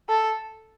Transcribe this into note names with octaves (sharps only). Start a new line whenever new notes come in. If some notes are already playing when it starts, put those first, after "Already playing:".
A4